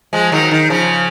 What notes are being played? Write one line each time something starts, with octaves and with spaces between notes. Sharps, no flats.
F3 G#3
D#3 F#3
D#3
C#3 F3